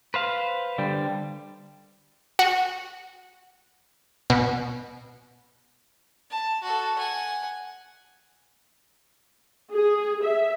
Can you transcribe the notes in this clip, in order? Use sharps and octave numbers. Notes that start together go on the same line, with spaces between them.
B4 C5 F5
D3 G3 G5
F#4
B2
A5
F#4 A4
F#5 G#5
G#4
E5